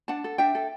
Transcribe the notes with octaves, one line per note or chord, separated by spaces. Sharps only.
D4 F#5 A5
A4
D4 E5 G5
A4